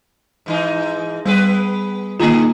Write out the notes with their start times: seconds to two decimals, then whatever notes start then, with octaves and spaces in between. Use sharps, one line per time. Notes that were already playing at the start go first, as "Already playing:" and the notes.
0.46 G#2 E3 D#4
1.26 G3 B3 G#4 B4
2.20 D3 D#3 A#3 F4 G#4